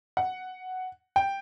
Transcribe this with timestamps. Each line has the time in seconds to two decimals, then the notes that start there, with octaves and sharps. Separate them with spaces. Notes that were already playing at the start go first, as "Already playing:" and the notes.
0.17 F#5
1.16 G5